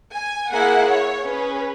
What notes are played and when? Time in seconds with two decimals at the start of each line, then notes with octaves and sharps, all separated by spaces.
0.13 G#5
0.51 A#3 E4 G#4 F#5
0.90 C#5
1.28 C#4 G#4 B4